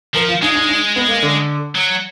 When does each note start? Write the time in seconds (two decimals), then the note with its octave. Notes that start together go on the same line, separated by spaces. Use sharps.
0.14 F3 A#4
0.28 F4
0.42 G#3 D#4
0.55 D#4
0.69 D#4
0.96 B3
1.08 A#3
1.22 D3
1.75 F#3